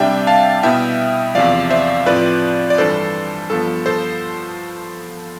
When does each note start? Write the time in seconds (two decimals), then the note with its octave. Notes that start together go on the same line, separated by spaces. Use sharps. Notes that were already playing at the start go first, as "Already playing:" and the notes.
Already playing: C3 G3 D4 E5 G5
0.27 F5 A5
0.63 B2 G3 B3 E4 E5 G5
1.35 E2 C3 F3 D5 F5
1.70 C5 E5
2.06 A2 F3 C4 B4 D5
2.70 D5
2.78 G2 E3 G3 D4 A4 C5
3.50 G2 F3 B3 A4
3.86 A4 C5